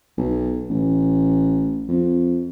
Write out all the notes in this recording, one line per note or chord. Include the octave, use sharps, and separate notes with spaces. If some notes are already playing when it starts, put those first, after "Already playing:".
B1
A1
F2